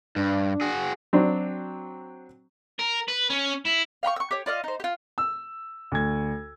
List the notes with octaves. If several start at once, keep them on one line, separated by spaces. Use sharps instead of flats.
G2 D4
F#4 G#4
F#3 C4 D4
A#4
B4
C#4
E4
F5 G5 B5 C#6
C#6 E6
G4 C#5
F4 D5 D#5 F5
D#4 C5
F4 G4
E6
D2 G#6